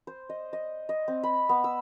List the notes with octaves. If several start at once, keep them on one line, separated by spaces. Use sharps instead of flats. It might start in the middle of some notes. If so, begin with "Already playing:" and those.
C5
D#5
D#5
D#5
C4
B5
B3
E6